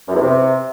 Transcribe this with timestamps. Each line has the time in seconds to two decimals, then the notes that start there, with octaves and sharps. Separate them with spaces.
0.08 F#2
0.14 E2
0.21 C3